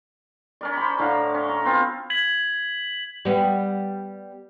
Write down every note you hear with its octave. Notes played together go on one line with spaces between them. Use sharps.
C#4 A#4 D5
C5 B5
A2 D3 F5 A#5
C#4
A#5
B3 C4 F4
G#6 B6 F#7
G3 B3